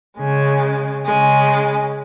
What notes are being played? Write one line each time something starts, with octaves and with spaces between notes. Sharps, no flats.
C#3 G#3
C#3 G#3